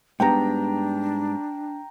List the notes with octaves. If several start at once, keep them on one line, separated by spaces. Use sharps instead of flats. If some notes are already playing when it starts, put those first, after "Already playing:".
G#2 G3 B3 D4 G5 A#5